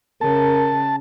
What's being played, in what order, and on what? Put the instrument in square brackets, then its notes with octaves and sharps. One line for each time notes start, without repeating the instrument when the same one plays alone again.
[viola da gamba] C#3 [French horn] A#4 [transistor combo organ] A5